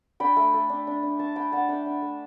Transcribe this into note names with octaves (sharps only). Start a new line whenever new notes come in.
D4 G5 B5
A3
A3
D4
D4
D4
D4 A5 C#6
D4 G5 B5
D4 F#5 A5
D4 E5 G5
D4
A3